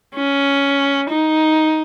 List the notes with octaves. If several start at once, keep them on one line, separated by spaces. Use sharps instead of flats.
C#4
D#4